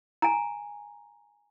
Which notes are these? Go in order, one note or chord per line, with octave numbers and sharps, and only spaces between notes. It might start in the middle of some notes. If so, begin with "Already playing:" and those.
G#5 A#5